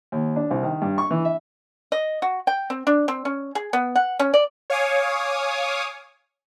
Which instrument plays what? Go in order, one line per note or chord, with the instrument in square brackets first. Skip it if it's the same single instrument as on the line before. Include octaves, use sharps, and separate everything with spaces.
[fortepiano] D#2
D4
C2
D#3
G2
C#6
E3
E5
[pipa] D#5
F#4
G5
C4
D4
C4
C#4
G#4
B3
F#5
C#4
D5
[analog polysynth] C#5 F5 G#5 D6 D#6